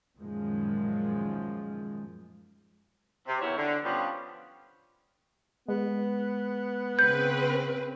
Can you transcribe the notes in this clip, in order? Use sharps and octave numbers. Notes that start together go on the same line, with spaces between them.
F#2 A#2 D#3 F3 G#3
C3
E2 D#3 F#3 E4 C#5
D3
F3 G3 B3 C#4 D4 F4
G#3 B3
C#3 C4 B4 G6